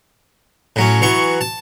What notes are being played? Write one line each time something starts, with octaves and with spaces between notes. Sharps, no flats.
A2 F#3 C#4
E3 F#3 C#6
A5